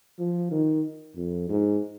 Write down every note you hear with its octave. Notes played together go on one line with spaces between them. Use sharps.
F3
D#3
F2
G#2